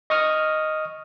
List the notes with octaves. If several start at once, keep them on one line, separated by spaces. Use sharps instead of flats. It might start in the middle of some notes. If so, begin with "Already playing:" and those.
D#5 C#6 D#6 F6